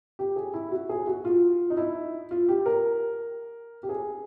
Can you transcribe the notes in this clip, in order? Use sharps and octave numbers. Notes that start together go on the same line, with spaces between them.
G4
G#4
E4
F#4
G#4
F#4
F4
D#4
E4
F4
G4
A#4
G4
G#4